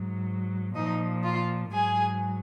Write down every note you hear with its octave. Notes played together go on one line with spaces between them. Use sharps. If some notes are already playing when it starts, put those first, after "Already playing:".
Already playing: G#2 F#3
A#2 F3 D#4 D#5
F4 F5
G#2 F#3 G#4 G#5